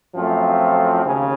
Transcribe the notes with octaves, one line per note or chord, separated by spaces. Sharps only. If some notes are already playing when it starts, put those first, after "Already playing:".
F#2 F3 A3 C4 F4
D#2 C#3 C#4